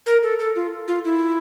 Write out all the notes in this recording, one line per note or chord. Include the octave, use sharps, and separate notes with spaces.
A#4
A4
A4
F4
F4
E4